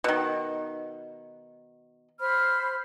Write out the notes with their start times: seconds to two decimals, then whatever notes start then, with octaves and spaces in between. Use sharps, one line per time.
0.04 B2 D#3
2.20 C5 B5 F6